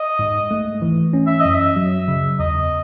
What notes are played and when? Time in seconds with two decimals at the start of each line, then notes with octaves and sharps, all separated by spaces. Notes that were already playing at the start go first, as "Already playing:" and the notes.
Already playing: D#5
0.19 G#2
0.51 A3
0.82 E3
1.13 C#4
1.27 E5
1.40 D#5
1.45 F#2
1.54 E5
1.76 F#3
2.08 C#3
2.40 E2 D#5